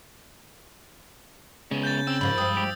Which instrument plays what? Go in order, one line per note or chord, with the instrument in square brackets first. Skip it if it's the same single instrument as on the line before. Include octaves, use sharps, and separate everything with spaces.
[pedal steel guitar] C#3 [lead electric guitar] G#3 B3
[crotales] G6 A6
[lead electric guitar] C4 [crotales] E6
[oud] G#2 F3 A#3 [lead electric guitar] G#3 B5
[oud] G2 F3 [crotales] D#6
[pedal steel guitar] G4